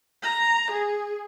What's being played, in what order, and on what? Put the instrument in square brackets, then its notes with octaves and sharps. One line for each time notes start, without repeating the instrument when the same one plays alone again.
[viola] A#5
G#4